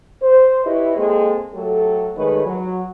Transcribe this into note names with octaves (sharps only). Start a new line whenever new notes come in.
C5
E4 G4 B4 C#5 D#5
G#3 A#3 C4 G#4 A4
F#3 A3 G4 A4
D#3 G#3 A3 B4 C#5
F#3